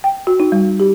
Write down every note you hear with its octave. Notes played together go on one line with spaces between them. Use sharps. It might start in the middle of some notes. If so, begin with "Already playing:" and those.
G5
F#4
D#4
G3
G4